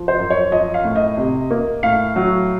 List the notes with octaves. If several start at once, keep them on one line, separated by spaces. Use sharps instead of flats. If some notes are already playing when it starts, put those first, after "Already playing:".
Already playing: F3
C5
F#2
C#5
F3 D#5
F5
A2
D#5
C3
A#3
A2 F5
F#3